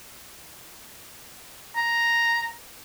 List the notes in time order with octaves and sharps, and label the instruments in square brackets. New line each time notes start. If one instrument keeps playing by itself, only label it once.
[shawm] A#5